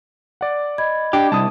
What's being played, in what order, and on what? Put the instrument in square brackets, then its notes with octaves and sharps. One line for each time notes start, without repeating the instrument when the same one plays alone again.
[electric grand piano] D5 F#5
[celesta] D#5 B5 G#6
[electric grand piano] D4 [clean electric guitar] G4
[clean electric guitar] C2 [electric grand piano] A5 D#6